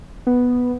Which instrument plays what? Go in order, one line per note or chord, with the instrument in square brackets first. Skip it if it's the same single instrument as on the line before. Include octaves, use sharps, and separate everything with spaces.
[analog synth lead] B3